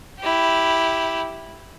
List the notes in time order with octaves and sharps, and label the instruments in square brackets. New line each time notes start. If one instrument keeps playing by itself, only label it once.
[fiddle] E4 G4